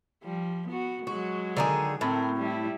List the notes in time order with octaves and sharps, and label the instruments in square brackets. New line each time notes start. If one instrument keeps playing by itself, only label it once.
[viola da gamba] F3 G3
B3 F#4
[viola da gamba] F#3 G#3 [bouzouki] F#4
[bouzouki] D3 D#3 G#4
[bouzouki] A2 [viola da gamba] C4 A#4
[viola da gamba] G3 E4